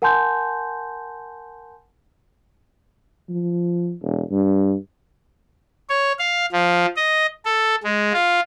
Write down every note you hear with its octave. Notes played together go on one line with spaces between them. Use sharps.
A#4 F#5 G#5 A5 C6 G6
F3
E1
G2
C#5
F5
F3
D#5
A4
G#3
F4